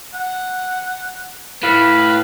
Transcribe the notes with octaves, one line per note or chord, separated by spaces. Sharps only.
F#5
A2 B4 F5 B5